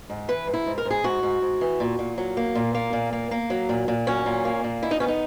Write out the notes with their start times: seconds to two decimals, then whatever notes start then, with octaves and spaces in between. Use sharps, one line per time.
0.10 G#2
0.28 E3 B4
0.48 G#2
0.54 E4
0.66 G#2
0.78 A#4
0.85 G#2
0.91 G#4
1.04 G#2 F#4
1.23 G#2
1.42 G#2
1.61 E3
1.80 A#2
1.99 A#2
2.18 F#3
2.37 A#3
2.55 A#2
2.75 A#3
2.93 A#2
3.13 A#3
3.31 A#3
3.50 F#3
3.69 A#2
3.88 A#2
4.07 F#3 C#4
4.26 A#2
4.45 A#3
4.64 A#2
4.82 D#3 E4
4.91 D#4
5.00 B3 C#4
5.08 D#4